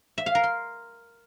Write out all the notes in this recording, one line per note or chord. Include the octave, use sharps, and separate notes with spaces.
E5
F5
A#4
C6